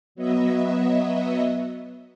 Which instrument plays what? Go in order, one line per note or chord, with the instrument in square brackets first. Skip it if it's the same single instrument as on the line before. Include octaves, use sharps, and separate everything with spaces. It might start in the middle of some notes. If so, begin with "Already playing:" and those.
[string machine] F#3 B3 D#5 E5